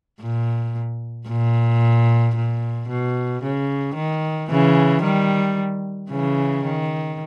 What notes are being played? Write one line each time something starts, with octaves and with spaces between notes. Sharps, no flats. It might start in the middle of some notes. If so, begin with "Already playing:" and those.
A#2
A#2
A#2
B2
C#3
D#3
C#3 E3
D#3 G3
C#3 E3
D#3